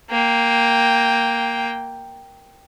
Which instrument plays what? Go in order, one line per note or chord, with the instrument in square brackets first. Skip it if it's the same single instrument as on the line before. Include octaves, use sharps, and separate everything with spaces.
[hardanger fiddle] A#3 G5